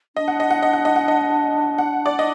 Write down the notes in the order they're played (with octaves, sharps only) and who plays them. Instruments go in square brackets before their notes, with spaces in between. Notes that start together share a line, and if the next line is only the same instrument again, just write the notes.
[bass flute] D4 [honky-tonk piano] D#5
[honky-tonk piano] F#5
D#5
F#5
D#5
F#5
D#5
F#5
D#5
F#5
D5
D#5